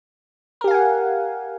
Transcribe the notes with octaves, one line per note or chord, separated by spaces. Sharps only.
G4 A#4 F5 F#5 G#5